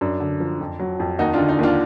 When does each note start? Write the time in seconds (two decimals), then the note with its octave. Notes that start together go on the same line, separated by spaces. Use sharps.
0.01 F#2 D4
0.20 D3
0.40 F3
0.60 F2
0.79 F#3
1.00 F2
1.19 D#2 D#4 F#4
1.33 D3 D4 F4
1.48 D#4
1.59 D#2 D4 F4